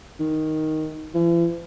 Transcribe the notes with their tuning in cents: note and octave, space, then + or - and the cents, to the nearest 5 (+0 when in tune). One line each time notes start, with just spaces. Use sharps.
D#3 +5
E3 +45